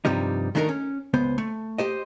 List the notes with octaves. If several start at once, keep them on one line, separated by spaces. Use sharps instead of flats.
G2 C3 F3 G3 D#4
D#3 A3 D4 D#4 A4 A#4
C#4
C#2 B3 C5
A3
G4 C5 D#5